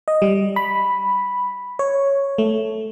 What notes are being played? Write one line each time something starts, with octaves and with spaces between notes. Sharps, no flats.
D#5
G3
B5
C#5
A3